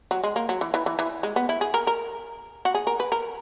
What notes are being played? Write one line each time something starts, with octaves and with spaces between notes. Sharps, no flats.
F#3
G#3
A#3
F#3
E3
E3
E3
E3
G#3
B3
E4
G#4
A#4
A#4
F#4
G#4
A#4
B4
A#4